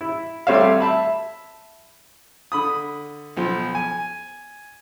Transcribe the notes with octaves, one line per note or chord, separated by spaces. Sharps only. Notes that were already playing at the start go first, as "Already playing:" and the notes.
E4
G3 A3 C4 C#5 E5 F5
E5 A5 B5
D3 B5 D#6
B1 F3
G#5